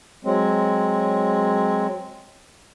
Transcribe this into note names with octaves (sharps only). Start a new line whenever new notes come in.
F#3 G#3 C4